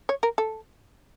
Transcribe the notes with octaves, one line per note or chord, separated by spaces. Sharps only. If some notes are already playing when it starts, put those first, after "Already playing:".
C#5
A#4
A4